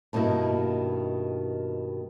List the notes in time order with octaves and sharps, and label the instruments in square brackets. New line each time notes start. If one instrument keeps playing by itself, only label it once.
[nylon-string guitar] G2 B2 D#3 A#3 E4